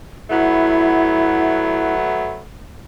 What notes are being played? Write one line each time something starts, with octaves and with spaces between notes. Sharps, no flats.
F#3 A3 B3 E4